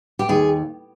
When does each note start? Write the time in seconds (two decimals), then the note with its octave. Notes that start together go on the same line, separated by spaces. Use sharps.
0.19 G4
0.29 D#2 G#4